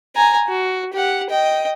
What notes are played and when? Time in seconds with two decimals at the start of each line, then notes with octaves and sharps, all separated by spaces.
0.16 G#5 A#5
0.48 F#4
0.93 G4 F#5
1.30 D#5 G5